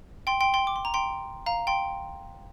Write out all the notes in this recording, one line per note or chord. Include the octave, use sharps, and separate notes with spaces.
G5 C6
G5 C6
G5 C6
D6
C6
A#5
G5 C6
F5 A#5
G5 C6